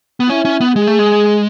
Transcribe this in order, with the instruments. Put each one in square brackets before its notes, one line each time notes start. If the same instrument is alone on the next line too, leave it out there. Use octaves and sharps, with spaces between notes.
[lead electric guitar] B3
[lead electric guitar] C#4 [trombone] E4
[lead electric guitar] C#4
B3
[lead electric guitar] G#3 [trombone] G#4
[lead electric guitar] A3
G#3